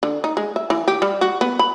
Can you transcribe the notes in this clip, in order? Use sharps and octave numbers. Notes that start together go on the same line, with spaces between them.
D3
D#4
G#3
E5
E3
G4
G3
F#4
B3
B5